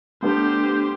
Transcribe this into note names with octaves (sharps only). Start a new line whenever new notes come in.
G3 A3 B3 D4 G4 A4 C5